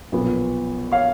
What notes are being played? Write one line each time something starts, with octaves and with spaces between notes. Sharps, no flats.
B1 A#2 F3 B3
C#5 F5